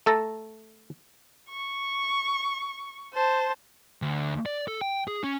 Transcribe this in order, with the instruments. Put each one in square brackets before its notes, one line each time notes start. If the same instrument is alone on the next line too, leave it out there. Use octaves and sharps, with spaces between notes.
[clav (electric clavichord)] A3 A4 A5 A#5
[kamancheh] C#6
C5 A5
[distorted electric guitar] D2
D5
A4
G5
G#4
C#4